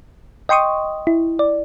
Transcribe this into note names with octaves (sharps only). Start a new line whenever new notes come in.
D#5 G5 C6 C#6 D#6
E4
D5